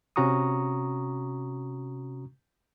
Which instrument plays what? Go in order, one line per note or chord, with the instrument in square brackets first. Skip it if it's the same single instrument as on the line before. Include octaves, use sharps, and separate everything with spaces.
[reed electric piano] C3 C#4 F#4 A#5 C#6 D#6